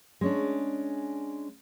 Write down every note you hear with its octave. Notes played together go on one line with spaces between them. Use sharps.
G#3 C#4 D4